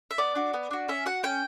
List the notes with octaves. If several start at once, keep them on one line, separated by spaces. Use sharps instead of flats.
E5
B3 D5
D4 F#4
B3
D4 F#4
C#4 E5
F#4 F#5
C#4 G5